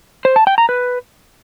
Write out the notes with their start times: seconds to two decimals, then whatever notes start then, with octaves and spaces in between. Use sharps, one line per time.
0.25 C5
0.36 A5
0.47 G5
0.58 A#5
0.69 B4